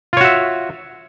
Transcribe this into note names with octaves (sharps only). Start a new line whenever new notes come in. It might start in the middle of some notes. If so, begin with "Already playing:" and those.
F4 F#4 C#5 E5